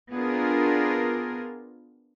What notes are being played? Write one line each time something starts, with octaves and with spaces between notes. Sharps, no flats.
B3 D4 F4 G#4 A#4